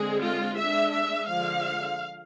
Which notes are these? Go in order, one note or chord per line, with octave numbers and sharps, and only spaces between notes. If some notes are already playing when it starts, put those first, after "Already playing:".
Already playing: D3 G#3 C4 G#4
F4
G#3 D4 E5
E5
D3 F3 G#3 F5